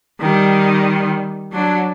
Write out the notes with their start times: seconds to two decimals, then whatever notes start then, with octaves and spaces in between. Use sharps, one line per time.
0.20 D#3 G3
1.52 F#3 D4